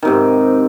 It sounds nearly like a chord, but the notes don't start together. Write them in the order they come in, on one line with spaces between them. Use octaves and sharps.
D#3 C3 G#2